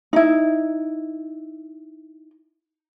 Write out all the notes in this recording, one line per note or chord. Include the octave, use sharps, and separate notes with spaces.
D#4 E4